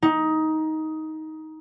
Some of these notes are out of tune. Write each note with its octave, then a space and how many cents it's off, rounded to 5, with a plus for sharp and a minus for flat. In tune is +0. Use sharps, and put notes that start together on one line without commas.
D#4 +15